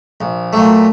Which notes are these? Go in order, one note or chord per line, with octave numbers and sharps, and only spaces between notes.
A#1
A#2 F#3 A3